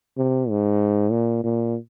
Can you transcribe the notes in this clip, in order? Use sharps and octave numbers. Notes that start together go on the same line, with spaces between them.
C3
G#2
A#2
A#2